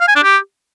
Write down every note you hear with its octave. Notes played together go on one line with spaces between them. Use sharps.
F5
G#5
D4
G4